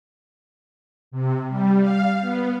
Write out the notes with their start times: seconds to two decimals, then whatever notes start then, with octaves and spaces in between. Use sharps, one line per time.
1.11 C3
1.48 G3
1.80 F5
2.21 B3